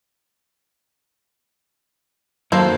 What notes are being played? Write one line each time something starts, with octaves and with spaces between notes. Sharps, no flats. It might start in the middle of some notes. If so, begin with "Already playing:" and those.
F#2 D#3 F#3 A#3 A4 C5